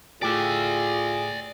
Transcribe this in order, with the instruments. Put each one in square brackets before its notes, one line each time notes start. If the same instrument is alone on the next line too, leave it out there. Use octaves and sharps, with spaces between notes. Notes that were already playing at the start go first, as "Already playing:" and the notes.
[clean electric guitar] A2 G4 [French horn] F4 [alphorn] G#4 [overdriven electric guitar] D5 E5